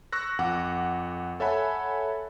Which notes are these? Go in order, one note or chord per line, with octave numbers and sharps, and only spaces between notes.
C#6 E6 F#6 A#6
F2 F#5 D6
A4 C#5 E5 F#5 G#5 B5